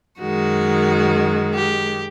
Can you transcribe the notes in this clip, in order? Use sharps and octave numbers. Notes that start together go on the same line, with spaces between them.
F#2 D#3 G#3 F#4
G4